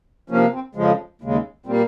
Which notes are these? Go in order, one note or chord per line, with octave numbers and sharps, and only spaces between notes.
C3 F3 A#3 C#4
C4
F2 C#3 F3 G#3
D#2 C#3 G#3
A#2 G3 A#3 C4